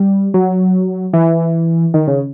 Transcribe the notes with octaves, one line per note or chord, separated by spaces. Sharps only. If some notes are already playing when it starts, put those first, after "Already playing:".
Already playing: G3
F#3
E3
D#3
C#3